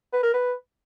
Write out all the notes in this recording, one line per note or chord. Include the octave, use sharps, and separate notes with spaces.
B4
A#4
B4